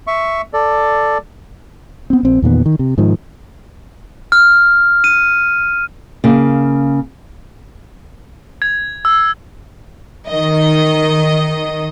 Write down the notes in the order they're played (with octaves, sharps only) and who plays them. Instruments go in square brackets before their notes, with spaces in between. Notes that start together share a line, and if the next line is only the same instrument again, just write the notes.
[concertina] E5 C#6
A4 D5
[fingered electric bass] B3 C4
A#1 C4
E2 A#2 D#3 B3
D#3
C3
G#2 D#3 F3
[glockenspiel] F6
D#7
[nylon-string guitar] C#3 A#3
[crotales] G#6
E6
[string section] D#3 D#5